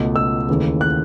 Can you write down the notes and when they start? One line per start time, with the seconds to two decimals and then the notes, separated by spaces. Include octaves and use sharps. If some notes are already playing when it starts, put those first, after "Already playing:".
Already playing: C#2 B2 A3
0.16 E6
0.49 D#2 C#3 E3 A3
0.81 F#6